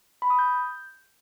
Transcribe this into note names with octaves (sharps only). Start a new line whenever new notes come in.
B5
D#6
G6